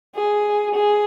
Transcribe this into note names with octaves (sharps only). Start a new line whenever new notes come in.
G#4
G#4